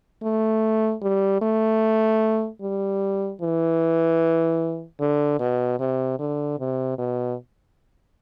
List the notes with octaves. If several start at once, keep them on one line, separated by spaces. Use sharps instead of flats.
A3
G3
A3
G3
E3
D3
B2
C3
D3
C3
B2